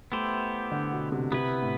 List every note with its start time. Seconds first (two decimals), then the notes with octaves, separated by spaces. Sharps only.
0.12 A3 B3 E4 G4 C5
0.72 D3
0.92 B2
1.12 C3
1.32 C3 B3 E4 B4
1.62 A2